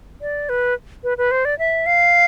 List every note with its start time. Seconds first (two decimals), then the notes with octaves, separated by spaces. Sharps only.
0.21 D5
0.49 B4
1.04 B4
1.18 B4
1.31 C5
1.45 D5
1.59 E5
1.86 F5